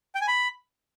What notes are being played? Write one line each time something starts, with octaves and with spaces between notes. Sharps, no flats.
G5
G#5
B5